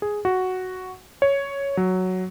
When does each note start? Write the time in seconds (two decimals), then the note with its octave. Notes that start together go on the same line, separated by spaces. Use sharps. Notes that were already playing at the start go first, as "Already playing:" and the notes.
0.02 G#4
0.25 F#4
1.22 C#5
1.77 F#3